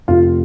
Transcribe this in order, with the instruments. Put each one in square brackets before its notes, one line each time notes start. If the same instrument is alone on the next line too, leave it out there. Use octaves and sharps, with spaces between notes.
[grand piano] F1 F4